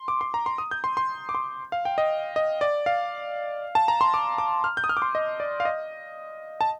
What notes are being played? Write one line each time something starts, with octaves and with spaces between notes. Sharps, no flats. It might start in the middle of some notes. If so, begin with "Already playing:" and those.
Already playing: C6
D6
C6
A#5
C6
D#6
G6
C6
C6
D6
C6
F5
G5
D#5
D#5
D5
F5
A5
A#5
C6
D6
D6
F6
G6
D#6
F6
D6
C6
D#5
D5
F5
D#5
A5